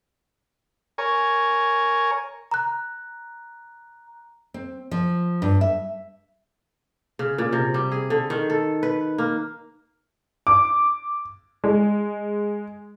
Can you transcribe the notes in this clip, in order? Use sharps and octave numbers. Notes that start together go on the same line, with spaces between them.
A#4 C#5 G#5
A#5 F#6
C4
F3
G2
E5
C#3
A#2
C3
G3
G#4
D3
D#3
A4
B4
A#3
D6
G#3